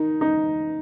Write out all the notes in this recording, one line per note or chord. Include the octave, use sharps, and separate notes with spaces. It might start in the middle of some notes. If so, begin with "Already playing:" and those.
Already playing: D#3 D#4
D#4